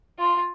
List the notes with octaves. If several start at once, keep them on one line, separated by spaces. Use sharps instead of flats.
F4